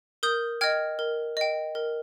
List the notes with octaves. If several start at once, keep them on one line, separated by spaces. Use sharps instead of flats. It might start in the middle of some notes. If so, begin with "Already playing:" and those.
A#4 D#6 G6
D#5 G5 F6 G#6
A#4
D#5 G5
A#4